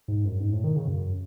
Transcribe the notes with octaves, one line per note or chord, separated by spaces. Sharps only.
G#2
F#2
G#2
A2
D#3
C#3
F#2